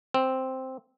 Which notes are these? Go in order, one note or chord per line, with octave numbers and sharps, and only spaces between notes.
C4